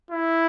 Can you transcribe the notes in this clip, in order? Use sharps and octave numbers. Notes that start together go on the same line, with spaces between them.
E4